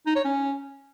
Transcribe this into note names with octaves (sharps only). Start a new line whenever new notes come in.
D#4
C#5
C#4